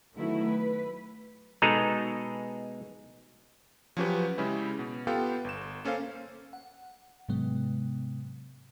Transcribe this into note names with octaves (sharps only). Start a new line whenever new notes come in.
D#3 F#3 A3 B3 E4 F#4
B4
B2 G#3 D#4 G#4 A4 A#5
F3 F#3 C#4 F#4 G4 B4
C#3 G#3 C#4 E4 G4
B2
B3 F4 G4 A4 F5 G5
G1 E7
A#3 C#4 A4 C5 F5
F#5
G#2 C3 F#3 G#3 B3